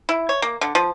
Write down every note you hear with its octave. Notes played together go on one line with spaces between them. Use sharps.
E4
C#5
A#3
D3
F3